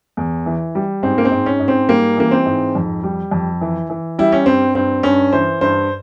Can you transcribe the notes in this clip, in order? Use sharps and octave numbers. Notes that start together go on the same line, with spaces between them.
E2
E3
G3
G#2 C4
A#3
C4
G#2
C#4
G#2
C4
G3 A#3
E3 A#3
C4
G#2
F2
G3
F2
E3
E3
G3 E4
C#4
G2 C4
G2 C4
G2 C#4
E3 C5
G2 C5